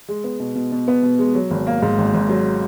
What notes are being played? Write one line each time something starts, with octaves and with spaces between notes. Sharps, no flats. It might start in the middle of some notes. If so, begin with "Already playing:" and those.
G#3
B3
B2
B2
B2
B3
B2
G#3
F#3
G#1
A#3
G#2
G#1
G#1
F#3